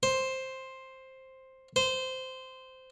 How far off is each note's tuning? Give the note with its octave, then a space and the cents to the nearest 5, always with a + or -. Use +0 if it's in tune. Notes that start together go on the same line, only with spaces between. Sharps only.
C5 +5
C5 -15